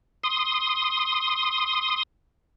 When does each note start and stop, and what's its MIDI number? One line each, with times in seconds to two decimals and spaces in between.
0.24 2.03 84
0.24 2.03 87